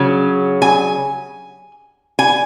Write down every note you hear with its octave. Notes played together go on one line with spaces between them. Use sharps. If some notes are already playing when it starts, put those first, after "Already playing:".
Already playing: C#3 F#3
G#5
G#5